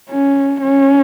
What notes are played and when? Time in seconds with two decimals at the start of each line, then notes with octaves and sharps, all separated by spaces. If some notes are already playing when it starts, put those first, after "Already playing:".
0.09 C#4
0.62 C#4